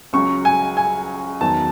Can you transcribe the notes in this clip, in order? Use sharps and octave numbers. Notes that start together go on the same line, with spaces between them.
C#2 C#3 F#3 C#6
G#5
G#5
E2 D#3 F#3 A5